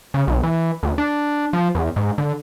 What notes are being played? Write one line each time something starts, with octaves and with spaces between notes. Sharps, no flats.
C#3
B1
E3
D2
D4
F3
E2
G#2
D3